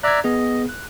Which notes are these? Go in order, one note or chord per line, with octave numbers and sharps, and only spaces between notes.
D5 E5 A#5 F#6 G#6
B3 G#4 D#5
F#6